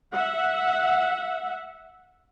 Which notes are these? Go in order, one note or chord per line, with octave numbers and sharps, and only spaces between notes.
E5 F#5